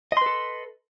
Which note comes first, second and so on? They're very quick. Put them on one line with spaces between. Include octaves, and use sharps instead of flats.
D#5 C6 B4 A4